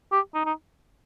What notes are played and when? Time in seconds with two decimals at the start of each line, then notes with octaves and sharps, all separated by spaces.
0.12 G4
0.34 D#4
0.45 D#4